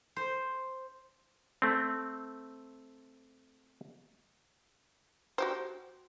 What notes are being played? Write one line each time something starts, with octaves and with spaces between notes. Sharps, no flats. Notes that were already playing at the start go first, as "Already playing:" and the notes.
C5
A3 C4
F#4 G4 C5